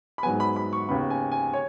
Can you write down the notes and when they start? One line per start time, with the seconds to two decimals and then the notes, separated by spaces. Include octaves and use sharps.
0.18 B5
0.23 B3 G#5
0.26 G#2 F#3
0.40 B5
0.56 B5
0.73 C#6
0.89 D#2 C#3 B3 B5
1.10 G#5
1.32 G#5
1.54 C#5